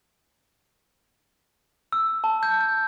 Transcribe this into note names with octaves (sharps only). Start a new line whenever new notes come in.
E6
A5
G6
G6